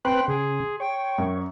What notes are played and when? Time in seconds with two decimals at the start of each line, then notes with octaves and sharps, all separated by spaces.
0.05 C4 B4 G5 C6 F#6
0.28 C#3 G#4
0.80 C#5 G5
1.18 F#2